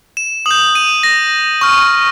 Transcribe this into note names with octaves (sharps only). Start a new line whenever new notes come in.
E7
D#6 G6 F#7
D#7
A#6
C#6 F6